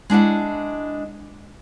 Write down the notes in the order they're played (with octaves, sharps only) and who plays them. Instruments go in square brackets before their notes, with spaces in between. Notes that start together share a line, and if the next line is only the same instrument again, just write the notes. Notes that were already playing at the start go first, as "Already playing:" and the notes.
[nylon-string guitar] G#3 D4 E4 F#5